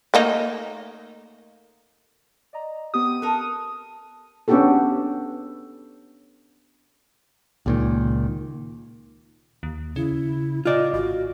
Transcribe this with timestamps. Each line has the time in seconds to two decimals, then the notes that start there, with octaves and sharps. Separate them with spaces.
0.14 A3 A#3 D#4
2.53 D5 D#5 A#5
2.94 B3 C4 G4 D#6
3.22 A4 A#4 F#6
4.48 B3 C#4 D4 F#4 G4 A4
7.66 C#2 A#2 D#3
9.63 D#2
9.96 C#3 E4
10.65 F4 D5 D#5
10.94 G#1 F#4